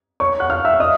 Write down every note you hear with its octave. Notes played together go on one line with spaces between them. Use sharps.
C#5 C#6
F#5 F#6
F5 F6
E5 E6
D#5 D#6